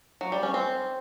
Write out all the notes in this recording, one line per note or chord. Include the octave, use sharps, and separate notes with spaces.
F#3
G3
C#4
C4